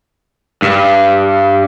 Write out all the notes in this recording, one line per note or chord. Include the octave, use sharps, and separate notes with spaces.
G2